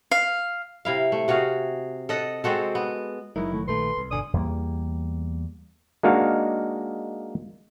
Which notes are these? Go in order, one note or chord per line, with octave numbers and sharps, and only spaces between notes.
F5
C3 E4 F5
A3
C3 F#4 G#4 F5
A4 D#5 F#5
G#3 C4 F#4 A4
B3
F#1 F#3 G#3 D#4 E4 A#4 E5
D#3 A3
A#1 D#3 A3 A4 B4 C6
C2
G1 B2 D3 D5 G#5 D#6
E2 G3 G#3 A#3
G#3 A#3 D4 D#4 F#4 F5